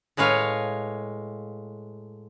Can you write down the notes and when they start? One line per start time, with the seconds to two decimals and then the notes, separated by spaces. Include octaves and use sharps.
0.17 A2 G#3 B4 C#5 F5